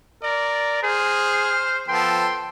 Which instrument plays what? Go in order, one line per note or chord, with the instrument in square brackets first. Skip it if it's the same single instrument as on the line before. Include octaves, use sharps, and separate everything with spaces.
[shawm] A#4 [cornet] D5
[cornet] G#4 [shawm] C5 [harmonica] F6
[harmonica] F3 B3 A4 [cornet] G5 [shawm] C6